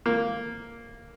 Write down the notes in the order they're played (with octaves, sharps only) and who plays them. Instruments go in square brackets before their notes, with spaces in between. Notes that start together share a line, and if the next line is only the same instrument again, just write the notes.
[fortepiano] A#3